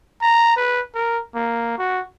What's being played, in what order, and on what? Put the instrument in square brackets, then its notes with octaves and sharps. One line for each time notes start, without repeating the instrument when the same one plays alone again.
[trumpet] A#5
B4
A#4
A#3
F#4